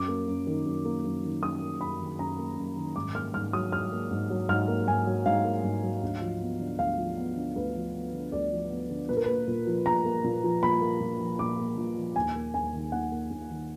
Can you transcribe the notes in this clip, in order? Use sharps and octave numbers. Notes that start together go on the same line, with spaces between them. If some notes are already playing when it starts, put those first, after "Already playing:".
Already playing: F#2 D6
A#3
F#2
D#3
F#2
A#3
F#2
D#3
F#2 D#6
A#3
F#2 B5
D#3
F#2 A#5
A#3
F#2
D#3
G#2 D6
A#3 F6
G#2 F6
F#3 D#6
G#2 F6
A#3
G#2
F#3
G#2 F6
A#3
G#2 G#5
F#3
G#2 F5
A#3
G#2
F#3
D2
F3
B3
D3
D2 F5
F3
B3
D3
D2 B4
F3
B3
D3
D2 D5
F3
B3
D3
A#2 B4
A#4
A#3 B4
A#2
F3
A#2 A#5
A#3
A#2
F3
A#2 B5
A#3
A#2
F3
A#2 D6
A#3
A#2
F3
D#2 G#5
A#3
D#2 G#5
D#3
D#2 F#5
A#3
D#2
D#3